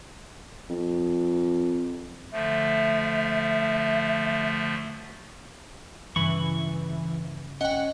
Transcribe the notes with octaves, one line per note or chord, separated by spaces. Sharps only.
F2
D3 F3 A3 E5
G2 C#3 E3 B5 C#6
C#4 D#5 F#5 G5